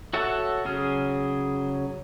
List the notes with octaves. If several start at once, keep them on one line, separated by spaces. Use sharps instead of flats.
F#4 A4 C#5 E5 F#5
C#3 F#3 G#4 F6